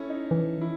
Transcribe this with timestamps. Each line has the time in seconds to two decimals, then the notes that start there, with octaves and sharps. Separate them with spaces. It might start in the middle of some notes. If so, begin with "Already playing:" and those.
Already playing: C#4 E4 A4
0.09 D#4
0.31 E3
0.61 E4